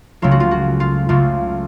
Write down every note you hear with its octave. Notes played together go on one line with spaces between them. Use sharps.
C#2 C#3 F#3 A3 F4
F#4
F4
F#4
F4
C#2 C#3 F#3 A3 F4